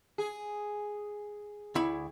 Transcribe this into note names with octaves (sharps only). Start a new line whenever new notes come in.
G#4
D2 E4 B5